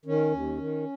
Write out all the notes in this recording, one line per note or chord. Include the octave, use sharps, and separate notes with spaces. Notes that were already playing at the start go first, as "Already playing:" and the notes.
D#3 C#4
D#2
D#3